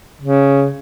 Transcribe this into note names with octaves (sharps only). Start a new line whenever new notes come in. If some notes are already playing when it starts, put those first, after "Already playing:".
C#3